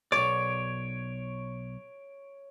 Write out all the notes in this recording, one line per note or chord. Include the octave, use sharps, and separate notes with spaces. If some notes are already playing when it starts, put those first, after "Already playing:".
B1 C#5 D5 D7